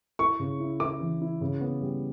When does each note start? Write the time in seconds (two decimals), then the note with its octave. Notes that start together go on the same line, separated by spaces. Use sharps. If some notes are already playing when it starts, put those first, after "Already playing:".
0.19 E4 C#6
0.39 C#3
0.60 E4
0.80 E4 D6
1.00 E3
1.21 E4
1.41 C#3
1.61 B3
1.81 G3